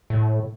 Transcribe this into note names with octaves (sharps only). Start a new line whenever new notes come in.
A2